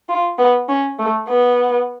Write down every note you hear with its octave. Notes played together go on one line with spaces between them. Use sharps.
F4
B3
C#4
A3
B3